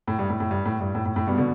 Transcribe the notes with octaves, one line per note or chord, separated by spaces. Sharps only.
A2
G2
A2
A2
G2
A2
G2
A2
A2
A2
G2 B2
B2 D3